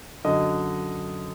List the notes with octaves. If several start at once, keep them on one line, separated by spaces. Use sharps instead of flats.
F#2 D3 D#5